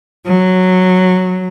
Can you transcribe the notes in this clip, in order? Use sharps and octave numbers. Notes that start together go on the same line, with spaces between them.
F#3